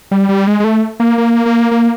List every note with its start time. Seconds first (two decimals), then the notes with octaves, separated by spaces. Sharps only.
0.11 G3
0.29 G3
0.47 G#3
0.60 G#3
0.64 A3
1.00 A#3
1.18 A#3
1.46 A#3
1.71 A#3